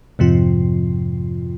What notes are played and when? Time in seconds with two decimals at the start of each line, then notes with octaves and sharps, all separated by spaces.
0.19 F2 G#2 C3 F3 F4